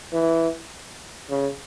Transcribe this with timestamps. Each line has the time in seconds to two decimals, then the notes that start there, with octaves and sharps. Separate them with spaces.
0.13 E3
1.30 C#3